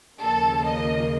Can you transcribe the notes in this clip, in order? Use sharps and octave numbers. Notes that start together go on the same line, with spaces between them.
D#2 C#3 F3 A#3 A4
D#5